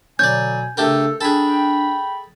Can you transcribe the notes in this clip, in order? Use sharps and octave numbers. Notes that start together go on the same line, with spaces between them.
B2 D3 F#3 C#5 D5 G#5 G6
C#3 A3 D4 G4 A4 A#4
D4 G#4 A4 G5 B5